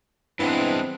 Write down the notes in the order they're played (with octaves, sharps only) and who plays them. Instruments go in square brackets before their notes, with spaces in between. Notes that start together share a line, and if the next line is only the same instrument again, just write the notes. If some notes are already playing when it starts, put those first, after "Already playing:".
[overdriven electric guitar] G2 G#3 [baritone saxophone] E3 [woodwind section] B3 D4 [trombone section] C4